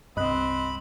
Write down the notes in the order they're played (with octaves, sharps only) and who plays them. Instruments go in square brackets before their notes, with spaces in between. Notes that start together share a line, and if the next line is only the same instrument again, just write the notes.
[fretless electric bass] C2 G2 [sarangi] C4 [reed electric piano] D#5 F#6 [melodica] B5